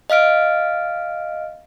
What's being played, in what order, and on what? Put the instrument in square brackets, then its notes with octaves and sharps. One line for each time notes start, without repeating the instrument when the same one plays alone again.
[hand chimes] D#5 F5 F6 D7